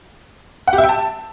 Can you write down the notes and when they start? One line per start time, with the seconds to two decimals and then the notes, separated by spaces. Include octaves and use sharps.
0.68 F#5
0.73 G4
0.78 E5
0.84 G5
0.89 A5